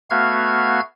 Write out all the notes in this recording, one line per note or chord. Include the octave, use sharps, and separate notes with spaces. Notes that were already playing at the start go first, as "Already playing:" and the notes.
A3 B3 F#4 F5 F6 G#6